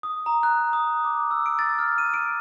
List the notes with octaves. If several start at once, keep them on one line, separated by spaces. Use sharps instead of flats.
D#6
A#5
F#6
D#6
D6
E6
D7
A6
F6
D#7
D7